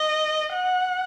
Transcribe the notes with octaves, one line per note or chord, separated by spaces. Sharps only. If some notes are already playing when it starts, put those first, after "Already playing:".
Already playing: D#5
F#5